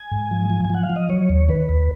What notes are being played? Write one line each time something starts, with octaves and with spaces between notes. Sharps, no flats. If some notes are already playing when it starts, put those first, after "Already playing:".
Already playing: G#5
G#2
F3
F3
G#5
F3 F#5
F5
F3
D#5
F#3 C#5
D#2
D#3 B4
D#2